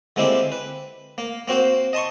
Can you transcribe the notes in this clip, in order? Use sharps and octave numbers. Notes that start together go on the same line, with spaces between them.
D3 G#3 A#3 C4 E4 G4
B4
A#3
A#3 C4 F#4 C5
D#5 A5 C6 C#6